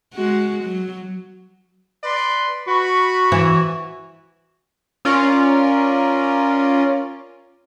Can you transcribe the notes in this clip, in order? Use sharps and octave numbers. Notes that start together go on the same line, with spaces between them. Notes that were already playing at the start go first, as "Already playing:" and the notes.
G#3 F#4
F#3
B4 D5 C6
F#4 B4 B5 C#6
E3
C#4 F4 A#4 D5